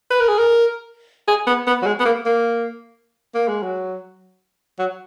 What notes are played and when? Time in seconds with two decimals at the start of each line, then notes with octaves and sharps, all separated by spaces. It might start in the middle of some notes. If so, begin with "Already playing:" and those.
0.11 B4
0.20 A#4
0.28 G#4
0.38 A#4
1.28 G#4
1.47 B3
1.67 B3
1.82 F#3
1.86 G#3
2.00 B3
2.05 A#3
2.26 A#3
3.35 A#3
3.48 G#3
3.63 F#3
4.79 F#3